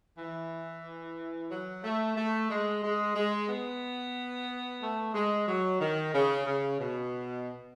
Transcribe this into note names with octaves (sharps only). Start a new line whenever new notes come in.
E3
F#3
A3
A3
G#3
G#3
G#3
B3
A3
G#3
F#3
D#3
C#3
C#3
B2